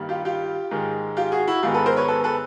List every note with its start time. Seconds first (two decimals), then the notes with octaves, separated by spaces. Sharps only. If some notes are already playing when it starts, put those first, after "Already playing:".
Already playing: G2 D#3 G3 A#3
0.09 F4 G4
0.25 F4 G4
0.71 G#2 D#3 G#3
1.17 F4 G4
1.32 F#4 G#4
1.47 E4 F#4
1.63 G#2 D#3 G#3 B3 F4 G4
1.74 A4 B4
1.86 A#4 C5
1.96 B4 C#5
2.08 A4 B4
2.24 A4 B4